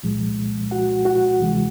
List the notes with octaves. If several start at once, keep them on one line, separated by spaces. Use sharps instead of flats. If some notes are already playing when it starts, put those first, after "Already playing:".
C2 A#2 F3 G#3
F#4 F#5
F#4 F#5
D2 C3 E3 G#3